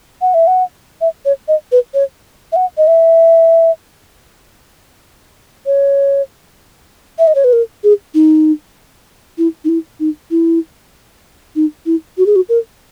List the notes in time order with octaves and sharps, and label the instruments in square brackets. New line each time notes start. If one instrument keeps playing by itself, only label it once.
[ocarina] F#5
E5
F#5
E5
C#5
D#5
B4
C#5
E5
F#5
D#5
E5
C#5
E5
D#5
C#5
B4
A#4
G#4
D#4
E4
D#4
E4
D#4
E4
D#4
E4
F#4
G#4
F#4
A#4